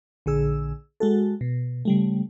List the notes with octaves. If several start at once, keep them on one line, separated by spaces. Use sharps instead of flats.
A#1 D3 G#4 E6
G#3 F#4 A4
B2
C#3 G3 A3